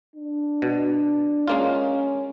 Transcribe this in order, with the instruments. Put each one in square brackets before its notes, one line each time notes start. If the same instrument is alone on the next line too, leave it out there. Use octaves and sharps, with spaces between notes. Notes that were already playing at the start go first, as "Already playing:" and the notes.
[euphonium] D4
[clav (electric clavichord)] B2
[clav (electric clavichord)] G#3 A#3 F4 [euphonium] C#4